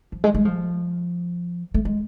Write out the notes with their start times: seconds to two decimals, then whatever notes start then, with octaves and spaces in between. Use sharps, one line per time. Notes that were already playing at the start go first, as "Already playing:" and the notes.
0.12 F3
0.24 G#3
0.35 G#3
0.45 F3
1.74 A3
1.85 G#3